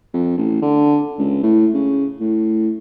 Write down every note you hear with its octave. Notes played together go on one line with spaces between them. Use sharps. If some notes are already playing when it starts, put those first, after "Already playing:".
F2
A1
D3
C#2
A2
C#3
A2